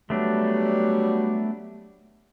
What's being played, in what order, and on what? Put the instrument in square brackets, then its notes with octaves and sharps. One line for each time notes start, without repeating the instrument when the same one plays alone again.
[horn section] F#3 G3 [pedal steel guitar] A3 B3 D4